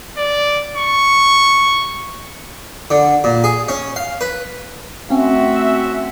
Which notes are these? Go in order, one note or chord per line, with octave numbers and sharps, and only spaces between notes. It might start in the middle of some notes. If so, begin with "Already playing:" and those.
D5
C#6
D3
A#2
G#4
C#4
F5
B4
A3 C4 C#4 F#4 E5